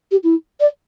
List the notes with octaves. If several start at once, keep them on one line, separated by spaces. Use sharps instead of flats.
G4
E4
D5